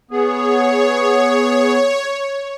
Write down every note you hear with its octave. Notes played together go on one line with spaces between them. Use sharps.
B3 G#4 C#5